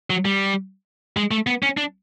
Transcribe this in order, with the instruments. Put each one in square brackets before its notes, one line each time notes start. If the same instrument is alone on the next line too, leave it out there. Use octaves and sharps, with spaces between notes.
[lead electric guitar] F#3
G3
G#3
A3
B3
C#4
D4